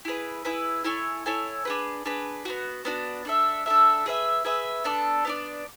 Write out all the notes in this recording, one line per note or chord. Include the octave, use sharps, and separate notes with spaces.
E4 G#4 B4
E4 G#4 B4
E4 A4 C#5 G#5
E4 A4 C#5 G#5
D4 G#4 B4
D4 G#4 B4
B3 D4 F#4
B3 D4 F#4
D4 A4 E5
D4 A4 E5
G#4 B4 E5
G#4 B4 E5
B3 D4 A4 D5
B3 D4 A4 D5